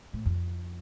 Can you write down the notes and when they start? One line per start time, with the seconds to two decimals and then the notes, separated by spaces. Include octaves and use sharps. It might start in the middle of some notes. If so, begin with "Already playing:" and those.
0.13 A2
0.26 F2